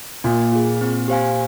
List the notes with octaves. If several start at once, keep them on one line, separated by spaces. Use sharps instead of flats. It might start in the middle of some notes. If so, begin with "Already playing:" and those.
A#2 A#3
F4 G#4
C4
G4 C5 F5 G#5